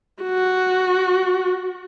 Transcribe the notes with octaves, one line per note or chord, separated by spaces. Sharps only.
F#4